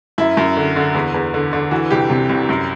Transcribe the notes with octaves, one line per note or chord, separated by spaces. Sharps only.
F#2 E4
F#2
D3
D3
E2
E2
D3
D3
E3 F#4
C2 G4
C3
C2
F#2